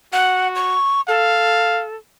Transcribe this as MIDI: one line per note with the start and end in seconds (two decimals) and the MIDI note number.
0.13 0.77 66
0.13 0.48 78
0.55 1.01 85
1.08 1.96 69
1.08 1.84 77